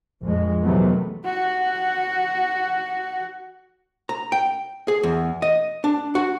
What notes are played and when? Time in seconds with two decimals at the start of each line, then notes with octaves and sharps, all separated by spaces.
0.23 A#1 F2 G#3
0.62 C3 D#3 E3 F#3 A3 B3
1.25 F#4 F#5
4.09 A#5
4.32 G5
4.88 G#4
5.03 E2
5.42 D#5
5.84 D4
6.15 F#4